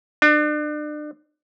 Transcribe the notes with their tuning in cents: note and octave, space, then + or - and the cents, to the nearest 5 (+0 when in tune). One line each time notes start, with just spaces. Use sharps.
D4 +35